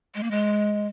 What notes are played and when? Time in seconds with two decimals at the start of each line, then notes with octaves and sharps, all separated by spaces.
0.15 G#3
0.23 A#3
0.31 G#3